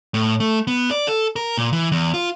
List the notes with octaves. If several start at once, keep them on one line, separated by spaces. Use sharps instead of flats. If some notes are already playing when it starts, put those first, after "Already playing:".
A2
A3
B3
D5
A4
A#4
A#2
E3
E2
F4